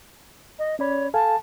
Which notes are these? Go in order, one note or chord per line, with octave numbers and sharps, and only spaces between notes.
D#5
C#4 C#5 D5 B5
A4 F5 G#5 A5